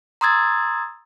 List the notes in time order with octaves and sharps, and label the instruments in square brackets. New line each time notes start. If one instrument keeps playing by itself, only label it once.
[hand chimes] A#5 C6 D#6 E6 G#6 A6